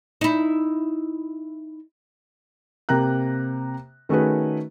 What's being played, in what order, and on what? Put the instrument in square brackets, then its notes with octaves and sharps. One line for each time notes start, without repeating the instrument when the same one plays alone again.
[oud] D#4 E4
[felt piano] C3 A#3 G5 A#5 F#6
D#3 A3 C#4 F#4 G#4 B4